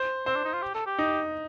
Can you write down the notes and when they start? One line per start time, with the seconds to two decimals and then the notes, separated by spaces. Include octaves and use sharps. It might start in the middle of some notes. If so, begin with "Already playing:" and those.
Already playing: C5
0.26 C4 C5
0.35 D4
0.45 D#4
0.53 F4
0.62 G4
0.74 A4
0.87 G4
0.99 D#4